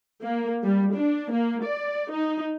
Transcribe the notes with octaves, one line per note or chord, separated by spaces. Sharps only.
A#3
G3
D4
A#3
D5
D#4